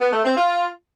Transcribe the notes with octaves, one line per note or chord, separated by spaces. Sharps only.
B3
A3
C4
F4